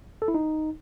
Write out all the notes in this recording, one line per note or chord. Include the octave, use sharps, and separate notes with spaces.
A4
E4
D#4